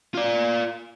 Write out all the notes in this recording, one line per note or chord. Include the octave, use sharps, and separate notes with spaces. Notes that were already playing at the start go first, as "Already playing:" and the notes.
F4 D5